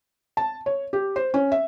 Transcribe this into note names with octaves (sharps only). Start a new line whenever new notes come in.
A5
C#5
G4
C5
C#4
E5